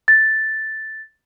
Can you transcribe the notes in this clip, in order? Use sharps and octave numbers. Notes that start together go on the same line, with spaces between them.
A6